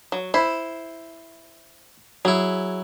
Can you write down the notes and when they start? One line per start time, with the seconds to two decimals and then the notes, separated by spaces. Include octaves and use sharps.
0.12 F#3
0.34 E4 C5
2.25 F#3 E4 G#4